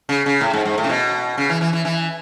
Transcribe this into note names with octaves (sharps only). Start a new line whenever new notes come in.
C#3
C#3
A2
G#2
G#2
A2
C#3
B2
C#3
E3
E3
E3
E3